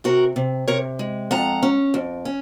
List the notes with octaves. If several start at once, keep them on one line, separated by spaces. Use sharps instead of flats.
C3 F#4 A#4
C3
C3 A#4 C#5
G#3
F2 F#5 A#5
C#4
F2
C#4